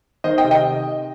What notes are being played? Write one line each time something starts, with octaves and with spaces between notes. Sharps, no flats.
D#3 C5 D#5
D#5 G5
C3
D#5 G5